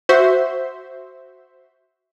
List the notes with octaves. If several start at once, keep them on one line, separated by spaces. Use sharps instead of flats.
F#4 C5 E5